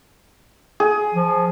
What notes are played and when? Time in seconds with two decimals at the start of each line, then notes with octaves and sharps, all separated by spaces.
0.80 G#4
1.14 F3